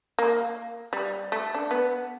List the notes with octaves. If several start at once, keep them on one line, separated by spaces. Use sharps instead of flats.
A#3
G3
A3
D4
B3